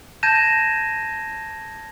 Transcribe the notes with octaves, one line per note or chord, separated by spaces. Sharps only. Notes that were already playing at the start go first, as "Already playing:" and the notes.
A5 G6 G#6 A#6 D#7 E7